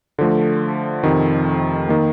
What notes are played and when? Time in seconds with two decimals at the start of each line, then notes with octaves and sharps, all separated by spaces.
0.19 D3 F3 A3
1.03 F2 C3 D#3
1.88 D#3 A#3